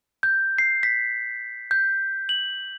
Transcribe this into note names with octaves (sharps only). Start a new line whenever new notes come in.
G6
C7
B6
G6
F#7